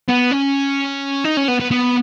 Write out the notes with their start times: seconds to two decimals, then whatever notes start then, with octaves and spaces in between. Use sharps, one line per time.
0.08 B3
0.31 C#4
1.24 D#4
1.37 C#4
1.48 B3
1.60 B3
1.71 B3